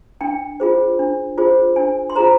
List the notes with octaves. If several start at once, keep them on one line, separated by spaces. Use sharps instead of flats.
D4 G5
F4 G#4 C5
D4
F4 G#4 C5
D4 G#5
C6
F4 G#4 C5 A#5